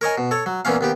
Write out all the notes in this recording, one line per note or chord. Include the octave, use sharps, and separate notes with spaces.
A#4 C#5 D#5 G#5
B2
A4 C#5
F#3
A#2 E3 B3 C#4 F5
D#2 B3 G4